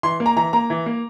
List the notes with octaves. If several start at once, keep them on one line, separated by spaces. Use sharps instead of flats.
E3 C6
A#3
A#5
E3 A#5
A#3 A#5
E3
A#3